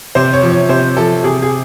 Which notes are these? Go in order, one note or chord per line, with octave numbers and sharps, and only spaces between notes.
C3 C5
C#5
F3
C#5
C3 C5
F3 A4
C3 G#4
G#4